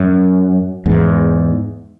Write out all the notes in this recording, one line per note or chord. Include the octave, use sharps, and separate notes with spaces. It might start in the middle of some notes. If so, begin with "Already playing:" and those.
Already playing: F#2
E2 G#2